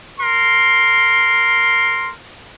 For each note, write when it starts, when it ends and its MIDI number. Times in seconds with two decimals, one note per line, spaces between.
0.21 2.12 70
0.21 2.12 84